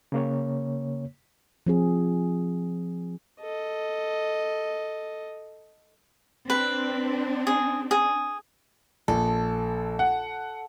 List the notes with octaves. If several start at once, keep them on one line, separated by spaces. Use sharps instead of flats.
C#3 A#3 C#5
F3 C4 G#4
A4 D#5
C4 D4 B4
G#4
G#4
A#1 A4
F#5